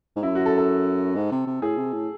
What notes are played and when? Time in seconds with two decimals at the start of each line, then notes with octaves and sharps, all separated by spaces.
0.16 G#2
0.23 F#2 E4
0.35 F#4
0.46 A4
0.58 A4
1.16 G#2
1.31 C3
1.47 C3
1.62 A2 G#4
1.78 C3
1.93 A2